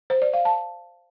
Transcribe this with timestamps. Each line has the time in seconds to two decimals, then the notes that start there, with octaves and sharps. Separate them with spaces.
0.10 C5
0.22 D5
0.33 F5
0.45 A5